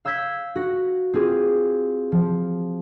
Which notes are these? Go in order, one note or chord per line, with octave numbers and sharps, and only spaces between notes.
F5 E6 G6 G#6 B6
F#4 A#6
C4 F4 G#4
F3